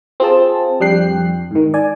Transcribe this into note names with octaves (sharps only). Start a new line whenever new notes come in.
C4 F4 G#4 A5
F2 G3 D4 G5 F#6 C7
F2
G#2 D#3
D5 G#5